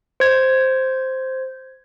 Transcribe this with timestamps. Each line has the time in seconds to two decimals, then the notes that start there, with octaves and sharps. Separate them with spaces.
0.20 C5 G#6